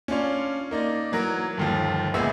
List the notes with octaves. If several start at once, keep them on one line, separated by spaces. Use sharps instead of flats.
C#4 D4 F4 C#5
A#3 D#4 D5
E3 F#3 A#4 F#6
G1 D#2 F3
C#2 A#2 B3 G#4 E5 E6